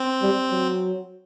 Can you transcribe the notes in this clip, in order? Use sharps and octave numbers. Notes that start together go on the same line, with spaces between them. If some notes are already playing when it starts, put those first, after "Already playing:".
Already playing: C4
G3
F#3